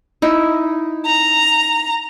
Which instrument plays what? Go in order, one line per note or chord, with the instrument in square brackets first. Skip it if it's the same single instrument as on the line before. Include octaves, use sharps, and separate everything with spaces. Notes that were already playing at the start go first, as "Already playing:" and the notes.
[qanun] D#4 E4
[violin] A#5